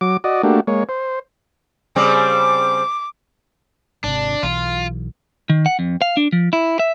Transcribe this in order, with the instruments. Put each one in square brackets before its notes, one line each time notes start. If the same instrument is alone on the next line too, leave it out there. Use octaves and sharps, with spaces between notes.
[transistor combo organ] F#3 D6
F#4 D5 D#5
A3 A#3 D4 F#4 G4
G#3 A#3 C#5
C5
[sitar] C#3 G3 C4 [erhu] D6
[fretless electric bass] G#1 C3 [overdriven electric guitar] D4
[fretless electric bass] B1 E3 [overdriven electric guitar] F4
[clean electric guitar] D#3
F#5
F2
F5
D4
F3
E4
E5